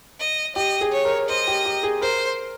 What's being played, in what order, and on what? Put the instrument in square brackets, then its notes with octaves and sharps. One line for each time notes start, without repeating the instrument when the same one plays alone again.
[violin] D#5
[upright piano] G4 [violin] D#5
[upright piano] G#4
[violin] C#5
[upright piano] A#4
[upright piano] C5 [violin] D#5
[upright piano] G4
G4
G#4
[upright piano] A#4 [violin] C5